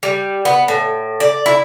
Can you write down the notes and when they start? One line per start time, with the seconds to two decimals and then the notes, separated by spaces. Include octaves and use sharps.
0.03 G3
0.45 B3
0.68 A2
1.20 D5
1.46 E4